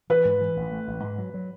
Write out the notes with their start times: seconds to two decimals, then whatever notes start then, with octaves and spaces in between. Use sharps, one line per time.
0.10 E3 B4
0.25 G#2
0.41 E3
0.57 A1
0.72 A3
0.87 A1
1.03 G#2
1.18 F#3
1.34 F#3